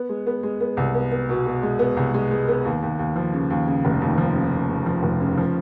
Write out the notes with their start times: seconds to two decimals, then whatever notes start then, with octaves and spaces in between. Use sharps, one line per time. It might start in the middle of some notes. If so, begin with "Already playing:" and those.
Already playing: B3
0.09 G#3
0.27 B3
0.43 G#3
0.61 B3
0.77 C2
0.95 B3
1.12 B3
1.29 B2
1.46 B2
1.63 G#3
1.79 B3
1.97 C2
2.14 G#3
2.31 G#3
2.48 B3
2.65 D#2
2.82 D#2
2.99 D#2
3.16 F3
3.33 C#3
3.50 D#2
3.68 C#3
3.85 F1
4.01 D#2
4.18 F3
4.35 C#3
4.53 C#3
4.69 C#3
4.86 F3
5.03 F1
5.21 C#3
5.37 F3